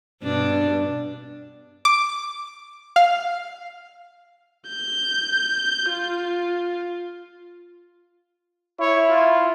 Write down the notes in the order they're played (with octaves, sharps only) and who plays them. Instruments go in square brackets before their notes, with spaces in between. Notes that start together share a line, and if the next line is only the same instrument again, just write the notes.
[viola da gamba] G2 B2 D4
[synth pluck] D6
F5
[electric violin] G6
F4
[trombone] E4 [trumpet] C#5
[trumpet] F4